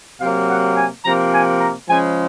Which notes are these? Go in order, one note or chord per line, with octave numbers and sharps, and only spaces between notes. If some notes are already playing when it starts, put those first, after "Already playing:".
C3 F#3 A#3 F5
F#5
G#5
C3 F3 A#3 A#5
G#5
A#5
C#3 F3 G#3 G#5